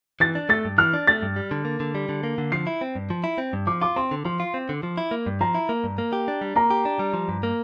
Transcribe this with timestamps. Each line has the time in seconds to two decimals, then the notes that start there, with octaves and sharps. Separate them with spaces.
0.20 E3 A6
0.35 D4
0.49 A3 A6
0.65 G2
0.78 E3 F6
0.94 D4
1.07 A3 A6
1.23 G2
1.36 G3
1.51 D3
1.65 A#3
1.80 D3
1.95 G3
2.09 D3
2.23 A#3
2.38 D3
2.52 F3 C7
2.67 E4
2.81 C4
2.95 G2
3.10 F3
3.24 E4
3.38 C4
3.53 G2
3.67 F3 D6
3.82 F4 D6
3.96 C4 C6
4.11 D3
4.25 F3 C6
4.40 F4
4.54 C4
4.69 D3
4.83 F3
4.98 E4
5.11 A#3
5.26 G2
5.41 F3 A#5
5.55 E4
5.69 A#3
5.84 G2
5.98 A#3
6.13 G4
6.28 D4
6.41 G3
6.56 A#3 A#5
6.70 G4
6.85 D4
6.99 G3
7.13 F3
7.29 G2
7.43 A#3